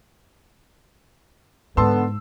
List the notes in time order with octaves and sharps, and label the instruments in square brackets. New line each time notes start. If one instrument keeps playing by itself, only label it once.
[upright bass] G#2 [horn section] D3 B3 [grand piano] A5 C6 E6